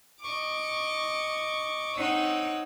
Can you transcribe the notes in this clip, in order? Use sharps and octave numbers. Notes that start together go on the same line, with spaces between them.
D#5 C#6 D6
C4 D#4 C#5 F#5 D#6 E6